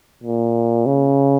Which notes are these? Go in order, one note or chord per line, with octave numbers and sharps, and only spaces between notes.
A#2
C#3